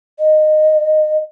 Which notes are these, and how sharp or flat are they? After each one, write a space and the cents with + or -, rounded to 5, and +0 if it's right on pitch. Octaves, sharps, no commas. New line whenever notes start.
D#5 -15